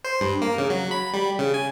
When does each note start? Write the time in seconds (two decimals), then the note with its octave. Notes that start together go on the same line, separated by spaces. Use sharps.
0.04 C5
0.20 G2
0.42 A#3
0.58 C#3
0.70 F#3
0.91 B5
1.13 G3
1.39 C#3
1.54 G#5